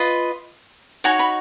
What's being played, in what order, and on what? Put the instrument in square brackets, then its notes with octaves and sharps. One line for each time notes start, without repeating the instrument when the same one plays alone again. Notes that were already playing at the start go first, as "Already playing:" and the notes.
Already playing: [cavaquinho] F4 B4 D#5
D#4 F#4 C#5 G#5
B5